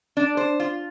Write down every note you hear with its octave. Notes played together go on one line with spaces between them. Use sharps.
D4
C5
F4